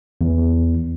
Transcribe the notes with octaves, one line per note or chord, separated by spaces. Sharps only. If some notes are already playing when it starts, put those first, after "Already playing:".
E2